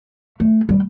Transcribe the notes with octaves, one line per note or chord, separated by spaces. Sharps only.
A3
G3